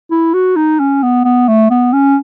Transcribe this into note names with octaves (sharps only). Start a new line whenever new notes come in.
E4
F#4
D#4
C#4
B3
B3
A3
B3
C#4